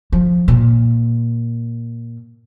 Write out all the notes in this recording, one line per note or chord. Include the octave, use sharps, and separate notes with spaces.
F3
A#2